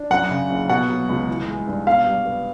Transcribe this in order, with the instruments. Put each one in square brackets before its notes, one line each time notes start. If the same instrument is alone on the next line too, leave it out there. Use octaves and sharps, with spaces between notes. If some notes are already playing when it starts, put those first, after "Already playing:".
Already playing: [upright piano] D4
[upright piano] F#2 [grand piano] F#5
[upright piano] C#3
F#1
[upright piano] B2 [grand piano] F#5
[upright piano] F#3
C#2
E3
G#3
G2
[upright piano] B2 [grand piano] F5
[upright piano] G3
B3